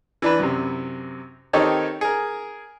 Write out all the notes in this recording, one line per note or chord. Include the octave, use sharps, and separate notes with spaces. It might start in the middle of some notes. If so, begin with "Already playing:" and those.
E3 D4 B4
F#2 C3
D#3 C4 D#4 G4 A4 C#5
G#4 A#4